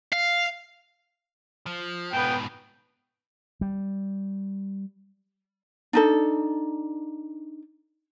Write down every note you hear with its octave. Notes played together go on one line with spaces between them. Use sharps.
F5
F3
G#2 B2 B3 G5
G3
D4 D#4 A4